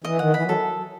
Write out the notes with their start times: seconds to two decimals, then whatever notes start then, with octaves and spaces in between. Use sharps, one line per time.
0.04 E3 D#5
0.19 D#3 F#5
0.34 E3 B5
0.44 F#3
0.49 A4